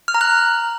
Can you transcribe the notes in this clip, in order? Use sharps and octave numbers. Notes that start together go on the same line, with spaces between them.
F6
A#5
F#6